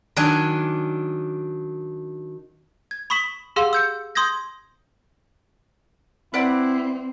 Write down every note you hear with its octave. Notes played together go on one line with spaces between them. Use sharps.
D#3 F#3 D4 G#5
G#6
B5 C#6 D#6 B6 E7 F#7
G4 G#4 F5 F#5 C6 E6
E6 G6 C#7
C6 D#6 G6 G#6 A#6
C4 E4 B4 D5 F#5